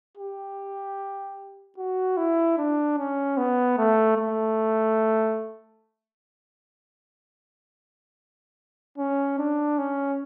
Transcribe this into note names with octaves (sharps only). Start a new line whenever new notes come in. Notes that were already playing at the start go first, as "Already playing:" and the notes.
G4
F#4
E4
D4
C#4
B3
A3
A3
C#4
D4
C#4